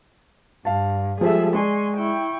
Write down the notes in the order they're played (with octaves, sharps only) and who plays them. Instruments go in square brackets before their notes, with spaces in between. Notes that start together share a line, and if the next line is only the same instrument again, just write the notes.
[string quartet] G2 [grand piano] F5 A5
[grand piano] F3 G3 G#3 [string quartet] G#4 A4 E5
[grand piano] G#3 D5 [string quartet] G#5 C6 C#6
[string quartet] E4 G5 C#6